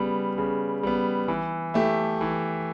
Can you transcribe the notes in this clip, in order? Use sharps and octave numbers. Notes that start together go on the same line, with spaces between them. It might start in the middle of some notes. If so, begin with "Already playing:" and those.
Already playing: C#3 G3 B3
C#3
G3 B3
E3
A3 E4 G4
E3